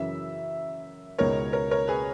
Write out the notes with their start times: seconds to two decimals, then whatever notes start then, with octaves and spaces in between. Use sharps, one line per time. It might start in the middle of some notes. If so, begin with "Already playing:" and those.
Already playing: F#2 C#3 E3 E5
1.18 C#2 B2 G#3 D#4 F#4 A#4 C#5
1.53 A#4 C#5
1.71 A#4 C#5
1.87 G#4 B4